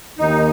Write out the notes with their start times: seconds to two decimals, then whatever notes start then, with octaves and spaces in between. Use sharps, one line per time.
0.19 D#2 D#3 D#4